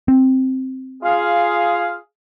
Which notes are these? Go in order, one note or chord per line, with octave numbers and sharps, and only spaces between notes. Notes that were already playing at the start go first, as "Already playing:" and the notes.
C4
F4 G#4 F5